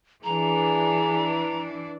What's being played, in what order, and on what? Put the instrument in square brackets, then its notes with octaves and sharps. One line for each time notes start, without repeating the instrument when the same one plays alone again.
[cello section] E3 D4 [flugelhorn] G#4 [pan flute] A#5